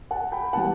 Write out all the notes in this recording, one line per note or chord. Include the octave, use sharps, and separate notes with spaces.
F#5 A5
G5 B5
E3 G3 F#5 A5